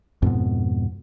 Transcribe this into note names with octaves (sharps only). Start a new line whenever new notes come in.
F2 G#2 B2